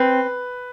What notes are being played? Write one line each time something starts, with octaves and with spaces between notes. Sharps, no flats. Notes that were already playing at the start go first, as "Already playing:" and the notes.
Already playing: C4 B4